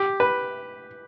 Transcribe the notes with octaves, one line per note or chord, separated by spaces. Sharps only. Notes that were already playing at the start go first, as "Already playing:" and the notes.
Already playing: G4
B4